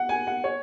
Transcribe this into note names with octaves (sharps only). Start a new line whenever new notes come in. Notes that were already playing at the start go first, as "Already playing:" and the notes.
Already playing: F#5
G#5
F#5
C#5